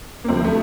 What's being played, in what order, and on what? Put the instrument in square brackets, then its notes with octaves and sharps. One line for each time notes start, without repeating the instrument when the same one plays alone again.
[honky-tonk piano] A#3
D2 C3 F3 C4
A3